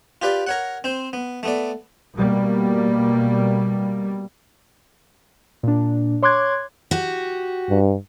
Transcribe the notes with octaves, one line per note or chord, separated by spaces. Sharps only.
F4 G4 B4 D5
A#4 C#5 F#5
C4 C5
B3
A3 B3 D5
B2 G3 A#3
A#2 D4
C#5 C6 D6 F#6 G#6
F#4 G4
G2